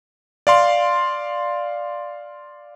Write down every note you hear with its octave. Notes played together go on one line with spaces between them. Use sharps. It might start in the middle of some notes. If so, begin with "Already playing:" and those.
D5 F5 C6